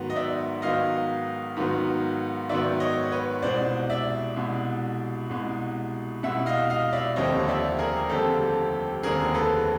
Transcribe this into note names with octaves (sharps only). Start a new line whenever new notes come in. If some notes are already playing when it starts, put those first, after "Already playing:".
Already playing: G#2 D#3 F#3 B3
D#5
D5 E5
G#2 D#3 F#3 B3 D#5 F5
G#2 D#3 F#3 B3
G#2 D#3 F#3 B3 D5 E5
C#5 D#5
B4 C#5
C2 B2 G#3 C5 D5
D5 E5
C2 B2 G#3
C2 B2 G#3
C2 B2 G#3 E5 F#5
D#5 F5
D#5 F5
D5 E5
F1 D#2 D3 G3 C4 C#5 D#5
D5 E5
G#4 A#4
F1 D#2 D3 G3 C4 G4 A4
F1 D#2 D3 G3 C4 G#4 A#4
A4 B4